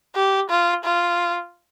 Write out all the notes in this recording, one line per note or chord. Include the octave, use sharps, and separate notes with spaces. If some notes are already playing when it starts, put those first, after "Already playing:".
G4
F4
F4